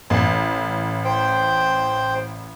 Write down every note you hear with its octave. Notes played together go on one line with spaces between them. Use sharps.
A1
C5 G5